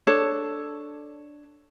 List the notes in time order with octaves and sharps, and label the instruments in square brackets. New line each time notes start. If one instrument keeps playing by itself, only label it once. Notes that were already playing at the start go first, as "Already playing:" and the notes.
[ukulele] D4 A4 C#5